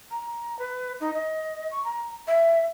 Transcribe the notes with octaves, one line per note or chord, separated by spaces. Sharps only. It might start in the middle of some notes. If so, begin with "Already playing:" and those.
A#5
B4
D#4
D#5
C#6
A#5
E5